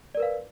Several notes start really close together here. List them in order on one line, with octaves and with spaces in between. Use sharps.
D5 A#4 B4 F5